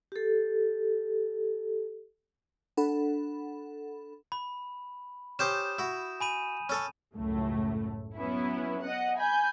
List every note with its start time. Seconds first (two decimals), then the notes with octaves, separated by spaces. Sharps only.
0.12 G4 A4
2.77 D4 A4 F#5 B5
4.32 B5
5.39 C#4 G4 C5 D#6 G6 E7
5.78 E4 F#4
6.20 G#5 B5 D#7
6.69 C#4 A4 C#5
7.15 C#2 F#2 A2 A3
8.17 F#3 B3 C#4 E4
8.82 D#5 F#5
9.17 G#5 B5 G6